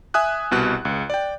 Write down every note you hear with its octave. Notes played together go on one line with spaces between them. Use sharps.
E5 G#5 D#6 F#6
C2 B2 F#6
C#2
D5 G5